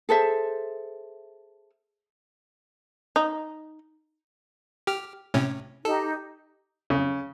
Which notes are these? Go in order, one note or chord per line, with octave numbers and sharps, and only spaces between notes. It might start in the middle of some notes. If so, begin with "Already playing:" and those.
G#4 A4 C5 E5
D#4
G4 F6
A2 C3 C#4
D#4 G4 A4
C#3